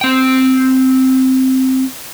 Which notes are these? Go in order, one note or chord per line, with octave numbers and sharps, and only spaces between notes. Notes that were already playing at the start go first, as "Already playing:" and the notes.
C4 G5